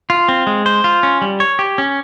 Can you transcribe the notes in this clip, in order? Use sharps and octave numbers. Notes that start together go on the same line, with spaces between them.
F4
C4
G#3
C5
F4
C#4
G3
C#5
G4
C#4